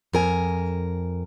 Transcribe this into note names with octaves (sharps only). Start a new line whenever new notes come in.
F2 A#4 G#5